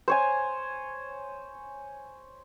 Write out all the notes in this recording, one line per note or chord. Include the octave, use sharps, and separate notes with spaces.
C5 C#5 G#5